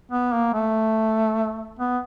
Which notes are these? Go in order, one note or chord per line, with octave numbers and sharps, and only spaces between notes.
B3
A#3
A3
B3